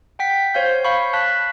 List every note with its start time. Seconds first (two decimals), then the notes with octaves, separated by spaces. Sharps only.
0.19 F#5 G5 B6
0.54 C5 C#5 F5 G6
0.84 F5 B5 C#6
1.13 F5 A5 F#6 B6